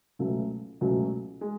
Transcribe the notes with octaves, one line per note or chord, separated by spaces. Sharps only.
C#2 B2 F#3 A3 C#4
C#2 B2 F#3 A3 C#4
G#3